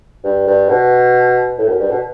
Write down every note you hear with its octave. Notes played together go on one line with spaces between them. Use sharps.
G2
G2
B2
A2
F#2
G2
B2